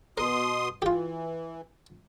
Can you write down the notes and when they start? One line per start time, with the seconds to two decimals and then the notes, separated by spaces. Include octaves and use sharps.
0.18 B2 A#4 C6 D#6
0.82 E3 F4 G4